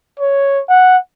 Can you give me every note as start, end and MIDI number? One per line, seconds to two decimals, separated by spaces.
0.20 0.61 73
0.69 0.97 78